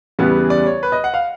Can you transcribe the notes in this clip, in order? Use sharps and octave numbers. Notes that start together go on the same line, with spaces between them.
E2 C#3 E3 G3 B3
D5
C#5
B4
D#5
F#5
F5